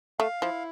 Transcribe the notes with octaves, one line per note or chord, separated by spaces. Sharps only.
A3 F5
F3 E4